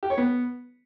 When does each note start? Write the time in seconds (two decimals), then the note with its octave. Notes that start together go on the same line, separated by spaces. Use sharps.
0.03 G4
0.10 C#5
0.18 B3